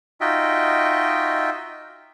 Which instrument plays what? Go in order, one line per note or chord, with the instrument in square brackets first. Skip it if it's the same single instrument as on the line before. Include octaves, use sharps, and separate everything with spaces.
[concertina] D#4 F4 F#4 D#5 E5 G5